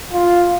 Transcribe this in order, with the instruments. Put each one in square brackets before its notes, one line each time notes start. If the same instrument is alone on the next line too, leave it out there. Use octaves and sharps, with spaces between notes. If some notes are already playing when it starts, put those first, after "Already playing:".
[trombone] F4